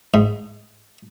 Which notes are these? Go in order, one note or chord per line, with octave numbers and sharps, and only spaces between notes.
G#2